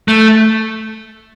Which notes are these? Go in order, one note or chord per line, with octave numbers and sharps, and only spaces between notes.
A3